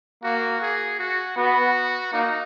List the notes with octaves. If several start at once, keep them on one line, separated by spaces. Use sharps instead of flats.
A#3 F#4
G#4
F#4
B3 F#4
A#3 D#4